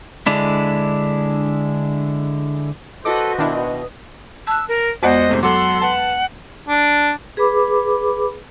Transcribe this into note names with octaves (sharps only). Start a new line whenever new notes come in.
D3 G#3 D4 E4
F#4 A4 B4 C5 D#5 D6
B2 D#3 D4 E4
A5 E6 F#6
A#4
F2 G#3 B3 F#4 C5 D5 D#5 F#5
G#2 C3 A3
F#3 A4 F#5 C6 D6
B4 F#5 A5
D4
G#4 B4 B5 D6